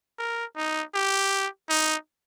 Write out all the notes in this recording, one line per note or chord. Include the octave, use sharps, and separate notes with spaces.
A#4
D#4
G4
D#4